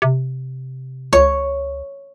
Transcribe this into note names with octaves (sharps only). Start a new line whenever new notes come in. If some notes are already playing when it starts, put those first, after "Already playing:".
C3
C#2 C#5